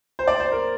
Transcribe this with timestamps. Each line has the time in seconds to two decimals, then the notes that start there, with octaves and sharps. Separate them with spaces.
0.19 C5
0.28 D5
0.40 C5
0.52 A#4